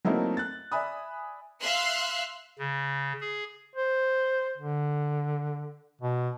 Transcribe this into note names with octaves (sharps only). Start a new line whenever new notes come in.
F#3 A3 A#3 C4 D#4 E4
F#6 A6
D5 E5 G#5 B5 D#6
E5 F5 C6 E6 F#6
C#3
G#4
C5
D3
B2